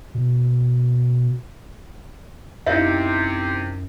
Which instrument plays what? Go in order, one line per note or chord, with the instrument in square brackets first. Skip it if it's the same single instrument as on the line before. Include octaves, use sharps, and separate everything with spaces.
[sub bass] B2
[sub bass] F#2 [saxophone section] C3 [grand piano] D#4 E4 [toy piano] C#5 E5 F5